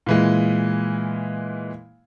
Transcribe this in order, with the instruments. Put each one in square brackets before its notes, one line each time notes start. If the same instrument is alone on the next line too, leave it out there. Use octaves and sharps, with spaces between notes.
[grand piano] A#2 E3 G#3